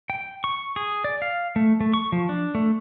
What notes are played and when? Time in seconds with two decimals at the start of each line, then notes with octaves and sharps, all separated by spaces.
0.10 G5
0.44 C#6
0.76 G#4
1.04 D5
1.22 F5
1.56 A3
1.81 A3
1.94 C#6
2.12 F3
2.29 D4
2.55 A3